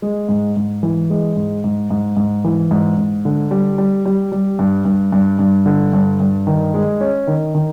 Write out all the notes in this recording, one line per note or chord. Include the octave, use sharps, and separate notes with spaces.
G#3
G#2
G#2
E3
G#3
G#2
G#2
G#2
G#2
E3
G#2
G#2
D3
G3
G3
G3
G3
G2
G2
G2
G2
D3
G2
G2
D#3
G#3
C#4
D#3
D#3